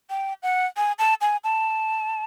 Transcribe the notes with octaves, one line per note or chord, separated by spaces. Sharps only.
G5
F#5
G#5
A5
G#5
A5